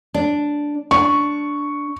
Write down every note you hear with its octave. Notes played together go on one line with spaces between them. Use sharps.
D4
D4 C#6